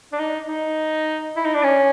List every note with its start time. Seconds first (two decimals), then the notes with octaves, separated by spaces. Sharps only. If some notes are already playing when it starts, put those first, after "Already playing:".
0.13 D4
0.19 D#4
0.48 D#4
1.36 E4
1.45 D#4
1.54 D4
1.63 C#4